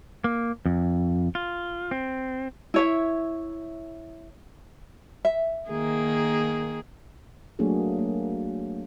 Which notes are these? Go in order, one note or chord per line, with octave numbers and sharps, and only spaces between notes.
A#3
F2
F4
C4
E4 C#5 E5
E5
D#3 A#3 G#4
F#3 A3 A#3 D4 F#4 G#4
A#3